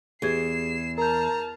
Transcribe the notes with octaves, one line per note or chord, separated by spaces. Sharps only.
E2 G4 G#4 G#6 C7 E7
A#4 A5 A#5 F6 G6